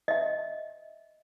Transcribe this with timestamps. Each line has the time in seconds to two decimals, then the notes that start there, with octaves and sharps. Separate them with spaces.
0.08 D#5 E5